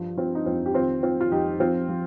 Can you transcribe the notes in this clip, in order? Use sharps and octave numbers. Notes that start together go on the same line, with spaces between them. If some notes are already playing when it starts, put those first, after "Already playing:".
Already playing: G2 F3
F3 C4 F4
D#4
F2 C4 F4
G4
D#3 C4 F4
D#3 C4 F4
F4
F2 D#4 G4
F3 C4 F4
F3